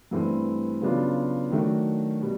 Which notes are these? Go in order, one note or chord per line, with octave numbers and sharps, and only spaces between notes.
G2 E3 A3 C4
C#3 F#3 B3 D4 F4
D#3 F#3 A3 D4 F#4
B2 G3